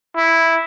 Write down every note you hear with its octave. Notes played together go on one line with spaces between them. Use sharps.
E4